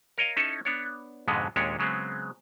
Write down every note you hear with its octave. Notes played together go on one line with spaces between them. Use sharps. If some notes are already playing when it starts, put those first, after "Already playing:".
A#4 C#5 D#5 F5
C#4 D#4 E4 A4 C#5
B3 D4 C#5
F2 G#2 B2 D3 G#3 B3
D#2 A#2 G#3 C#4 D4 C#5
C#3 F#3 G#3 B3 C4